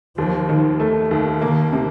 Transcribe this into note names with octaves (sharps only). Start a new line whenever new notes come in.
D#2 F3
D#3
A3
D#2
D#3 A#3
C3